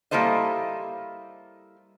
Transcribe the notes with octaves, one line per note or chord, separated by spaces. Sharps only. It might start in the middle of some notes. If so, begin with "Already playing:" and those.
G3 A#3 E4 A4 C5 D#5